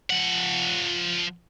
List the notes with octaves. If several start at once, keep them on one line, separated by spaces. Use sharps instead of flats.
F3 F#5